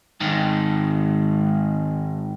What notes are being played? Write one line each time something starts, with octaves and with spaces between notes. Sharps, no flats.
G#2 D#3